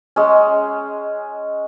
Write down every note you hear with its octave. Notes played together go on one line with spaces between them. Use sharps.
G#3 C#4